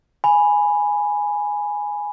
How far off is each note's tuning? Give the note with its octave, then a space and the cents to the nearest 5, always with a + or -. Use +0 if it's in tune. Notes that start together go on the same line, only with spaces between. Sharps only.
G#5 +0 B5 +0